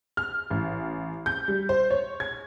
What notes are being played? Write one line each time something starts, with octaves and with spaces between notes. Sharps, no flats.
F6
A1
G6
G3
C5
C#5
G#6